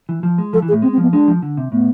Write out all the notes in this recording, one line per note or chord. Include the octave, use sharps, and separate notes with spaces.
E3
F3
G#3
F3 A4
E3
G#4
A2
G#3 C4
C4
F3 B3
G#3 D4
F3
D3
C3
A2 B3